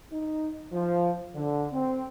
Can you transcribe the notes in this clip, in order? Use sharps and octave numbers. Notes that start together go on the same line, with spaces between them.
D#4
F3
D3
C4